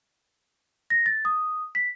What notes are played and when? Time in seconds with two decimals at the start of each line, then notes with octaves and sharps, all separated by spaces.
0.90 A#6
1.06 A6
1.25 D#6
1.75 B6